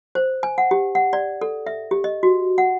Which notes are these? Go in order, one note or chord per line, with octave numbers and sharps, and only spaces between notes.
C5
G#5
F#5
G4
F#5
D5
A4
E5
G4
D#5
F#4
F#5